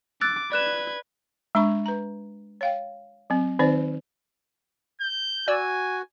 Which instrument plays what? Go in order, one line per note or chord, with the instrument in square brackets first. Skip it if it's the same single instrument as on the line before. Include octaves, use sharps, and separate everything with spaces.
[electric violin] D6 [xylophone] E6 F#6 A6
[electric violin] B4 G#6 [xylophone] D5 F#6 E7
[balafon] G#3 D4 B5 C#6
B4 A#5
C#5 F5 G5
F#3 C4
D#3 C4 D#4 C5 D5
[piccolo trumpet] G6
[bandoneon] F#4 [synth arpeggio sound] D5 E6 [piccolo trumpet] G#5